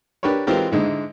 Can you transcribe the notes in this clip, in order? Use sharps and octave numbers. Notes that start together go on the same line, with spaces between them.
D4 G4 A#4 B4 C#5
E3 G#3 C4 F4 G4 A#4
G#2 D3 G#3 E4